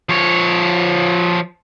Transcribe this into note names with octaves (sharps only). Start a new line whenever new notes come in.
F3 C#5